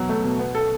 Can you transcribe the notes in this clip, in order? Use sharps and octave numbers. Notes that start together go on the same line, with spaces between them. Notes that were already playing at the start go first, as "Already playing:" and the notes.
Already playing: B2 F#3
A3
B2
B3
A4